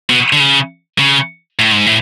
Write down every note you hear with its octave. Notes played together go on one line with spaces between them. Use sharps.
B2
D3
C#3
C#3
A2
G#2
A2